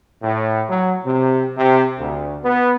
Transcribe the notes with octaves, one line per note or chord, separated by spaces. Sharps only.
A2
F#3
C3
C3
D2
B3